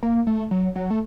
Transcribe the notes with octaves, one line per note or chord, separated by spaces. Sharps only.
A#3
A3
F#3
F#3
A3